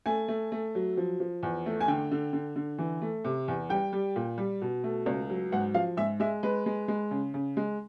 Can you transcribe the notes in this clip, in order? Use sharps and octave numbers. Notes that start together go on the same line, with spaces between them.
A3 G#5
A3
A3
F#3
F3
F3
E2
A3
G#5
D3 G5
D3
D3
D3
E3
A3
C3
E2
G3 G5
G3
A#2
G3
B2
A3
C#2
F#3
G#2 F#5
F3 F5
G#2 E5
G#3 E5
G#3 B4
G#3
G#3
C#3
C#3
G#3